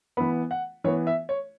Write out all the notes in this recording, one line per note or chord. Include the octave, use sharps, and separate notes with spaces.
E3 B3 B5
F#5
E3 B3 C#5
E5
C#5